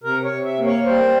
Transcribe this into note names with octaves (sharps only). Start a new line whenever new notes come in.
C3 A#4
C#5
C3
E5
A#3
C#5
G3 C5